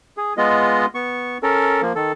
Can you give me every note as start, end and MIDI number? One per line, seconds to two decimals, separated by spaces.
0.17 0.33 68
0.37 0.86 56
0.37 0.86 59
0.37 0.86 65
0.37 0.86 75
0.95 1.38 59
0.95 1.38 85
1.43 1.81 61
1.43 1.81 69
1.43 1.81 70
1.82 1.93 53
1.82 1.93 58
1.95 2.12 51
1.95 2.12 69